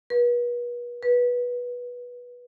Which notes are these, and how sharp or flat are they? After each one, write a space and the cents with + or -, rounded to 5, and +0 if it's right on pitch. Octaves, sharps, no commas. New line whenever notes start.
B4 -40
B4 -15